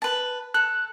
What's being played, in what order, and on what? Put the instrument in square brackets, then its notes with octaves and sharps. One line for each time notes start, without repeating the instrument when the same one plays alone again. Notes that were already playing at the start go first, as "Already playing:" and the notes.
[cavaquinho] B4 A5
[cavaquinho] A4 [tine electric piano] F#6